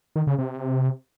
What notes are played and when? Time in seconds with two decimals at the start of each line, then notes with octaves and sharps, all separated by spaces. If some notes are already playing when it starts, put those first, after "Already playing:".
0.16 D#3
0.27 C#3
0.38 C3